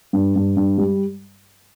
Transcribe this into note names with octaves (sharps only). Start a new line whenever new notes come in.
G2
G2
G2
G3